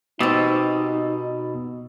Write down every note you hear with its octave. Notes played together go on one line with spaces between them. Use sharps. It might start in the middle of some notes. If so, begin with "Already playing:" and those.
B2 C4 D#4 G4 D#6 E6 A6